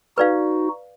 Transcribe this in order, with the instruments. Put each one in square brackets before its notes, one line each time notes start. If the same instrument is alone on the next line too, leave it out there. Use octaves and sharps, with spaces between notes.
[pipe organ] D#4 F#4 [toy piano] B4 D5 F5